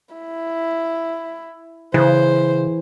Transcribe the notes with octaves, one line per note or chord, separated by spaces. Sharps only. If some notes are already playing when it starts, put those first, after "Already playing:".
E4
C#3 E3 C5